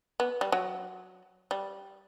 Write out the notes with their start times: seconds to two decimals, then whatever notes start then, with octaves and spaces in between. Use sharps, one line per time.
0.20 B3
0.41 G3
0.52 F#3
1.51 G3